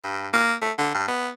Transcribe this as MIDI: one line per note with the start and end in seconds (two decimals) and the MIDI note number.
0.04 0.28 43
0.33 0.54 58
0.62 0.72 57
0.78 0.90 50
0.94 1.06 43
1.08 1.30 59